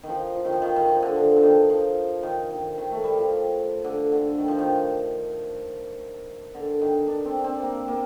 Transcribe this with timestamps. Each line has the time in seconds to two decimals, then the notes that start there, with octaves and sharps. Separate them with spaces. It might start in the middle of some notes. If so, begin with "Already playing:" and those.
0.03 D#3
0.09 F3
0.36 F3
0.45 D#3
0.52 F3
0.62 D#3
0.76 D#3
0.88 F3
1.02 D3
1.16 D3
1.37 D3
1.43 D#3
1.70 F3
2.23 D#3
2.51 D#3
2.78 D#3
2.91 A3
3.04 G3
3.17 F3
3.84 D3
4.12 D3
4.38 D#3
4.48 F3
4.59 D#3
6.55 D3
6.81 D#3
7.07 D4
7.25 C4
7.39 D4
7.44 C4
7.62 A#3
7.88 A#3